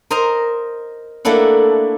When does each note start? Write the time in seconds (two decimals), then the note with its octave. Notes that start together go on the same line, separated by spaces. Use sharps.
0.11 A#4 C5 D#5 A#5
1.25 A3 A#3 D4 E4 F#5